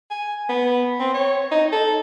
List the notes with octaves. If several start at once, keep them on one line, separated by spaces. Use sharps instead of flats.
G#5
B3
C4
C#5
D#4
A4